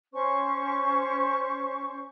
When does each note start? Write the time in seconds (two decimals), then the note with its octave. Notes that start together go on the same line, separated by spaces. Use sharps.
0.13 C#4 C5 C#6